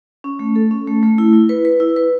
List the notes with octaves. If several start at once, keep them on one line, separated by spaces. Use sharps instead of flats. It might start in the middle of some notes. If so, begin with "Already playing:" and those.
C#4
A3
A4
C#4
A3
A3
E4
E4
B4
B4
E4
B4